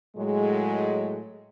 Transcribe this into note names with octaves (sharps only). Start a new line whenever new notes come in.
A2 F#3 G#3